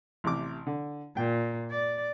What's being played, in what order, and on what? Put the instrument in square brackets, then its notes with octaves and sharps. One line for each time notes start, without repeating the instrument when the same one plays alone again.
[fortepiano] A1 C3 D6
D3
[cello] A#2 [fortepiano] G5
[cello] D5